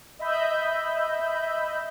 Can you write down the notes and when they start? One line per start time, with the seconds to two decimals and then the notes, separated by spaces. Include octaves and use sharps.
0.19 D#5 E5 B5 G6